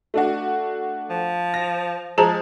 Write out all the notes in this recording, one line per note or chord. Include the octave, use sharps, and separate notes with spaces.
A3 D4 F#4
F3
A#6
F3 G#3 G#4 A5 A#5